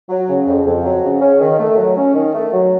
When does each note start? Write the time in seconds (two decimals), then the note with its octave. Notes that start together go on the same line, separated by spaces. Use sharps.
0.10 F#3
0.29 C#3
0.47 F2
0.66 F2
0.85 F#3
1.03 C#3
1.22 C#4
1.40 D#3
1.59 A3
1.78 F#3
1.97 C#4
2.15 D#3
2.35 A3
2.53 F#3